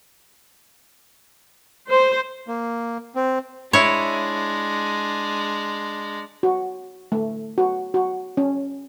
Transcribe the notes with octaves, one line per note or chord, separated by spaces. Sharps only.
C5
A#3
C4
G#3 D4 E4 C#5
F#4
A3
F#4
F#4
C#4